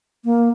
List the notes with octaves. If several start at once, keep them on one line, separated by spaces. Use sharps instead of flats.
A#3